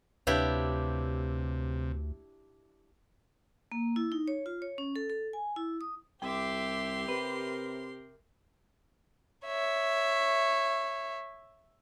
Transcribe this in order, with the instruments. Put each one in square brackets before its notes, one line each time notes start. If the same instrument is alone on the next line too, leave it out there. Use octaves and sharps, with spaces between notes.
[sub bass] D2 [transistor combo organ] C3 [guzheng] D4 E4 G4 [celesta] B4 C#5 F5
[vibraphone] A#3
E4
D#4
C#5
F4
C#5
C#4
A4
A4
G#5
E4
D#6
[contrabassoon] C2 [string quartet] G4 C6 [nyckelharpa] E5 D6 [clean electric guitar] G5
[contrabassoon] C3 [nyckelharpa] A#4 [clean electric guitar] B4
[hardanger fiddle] C#5 E5